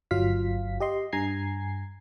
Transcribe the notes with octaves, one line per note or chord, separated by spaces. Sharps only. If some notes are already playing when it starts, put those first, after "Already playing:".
G1 F#3 F4 F5 B6
G4 D#5 C6
G2 G#5 A#5 G#6 C7